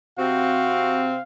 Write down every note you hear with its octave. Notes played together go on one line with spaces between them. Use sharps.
C3 C4 F#4 F5